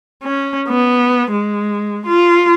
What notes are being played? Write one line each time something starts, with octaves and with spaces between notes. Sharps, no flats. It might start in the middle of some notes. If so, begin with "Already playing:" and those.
C#4
B3
G#3
F4